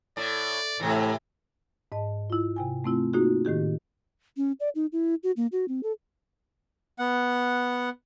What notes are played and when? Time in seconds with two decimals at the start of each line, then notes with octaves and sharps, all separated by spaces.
0.17 A2 D5
0.80 A2 C3 E3
1.92 G#2 D#5 A5
2.30 E4 F4
2.56 C3 G5 G#5
2.84 A3 C4 E4 F4
3.13 A#3 D#4 F4 F#4 G#4
3.45 A2 D#3 G4 G#4
4.37 C#4
4.60 D5
4.75 D#4
4.92 E4
5.23 F#4
5.37 A#3
5.52 F#4
5.68 C4
5.83 A4
6.99 B3 F#5